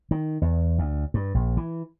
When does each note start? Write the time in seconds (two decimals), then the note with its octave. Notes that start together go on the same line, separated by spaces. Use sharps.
0.11 D#3
0.42 E2
0.79 D2
1.14 G2
1.34 A#1
1.57 E3